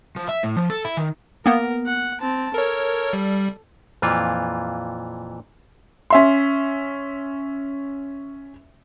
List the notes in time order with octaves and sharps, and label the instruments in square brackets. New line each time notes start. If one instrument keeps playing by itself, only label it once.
[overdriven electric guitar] F3
E5
A2
F3
A4
E4
D#3
[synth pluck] A#3 B3 [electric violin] A#4
[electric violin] F#5
C4 A5
[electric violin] A4 [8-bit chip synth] A#4 C#5
[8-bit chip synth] G3
[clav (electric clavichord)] F2 A#2 E3 F4
[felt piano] C#4 E5 C6